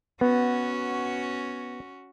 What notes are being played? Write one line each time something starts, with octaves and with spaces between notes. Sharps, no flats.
B3 C#4 F#4